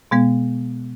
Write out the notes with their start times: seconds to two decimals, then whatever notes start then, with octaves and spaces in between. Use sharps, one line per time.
0.11 B2 G#3 B3